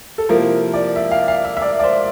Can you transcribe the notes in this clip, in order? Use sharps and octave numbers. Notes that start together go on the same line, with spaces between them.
A4
C3 F3 A#3 E4 A#4
D5
E5
F5
F5
E5
E5
D5
D5
C5